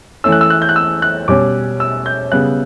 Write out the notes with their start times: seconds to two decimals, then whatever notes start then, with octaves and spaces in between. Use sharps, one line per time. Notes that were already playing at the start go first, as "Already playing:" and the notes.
0.24 E3 A3 C#4 E6
0.32 F#6
0.41 E6
0.50 F#6
0.62 G6
0.69 F#6
0.76 E6
1.02 F#6
1.28 B2 G3 C#4 D6
1.80 E6
2.06 G6
2.32 C#3 G3 B3 F#6